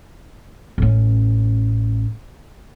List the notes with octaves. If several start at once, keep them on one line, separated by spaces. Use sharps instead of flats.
A1 C#4